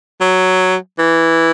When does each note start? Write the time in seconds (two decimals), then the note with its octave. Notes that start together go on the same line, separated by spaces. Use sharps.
0.21 F#3
0.99 E3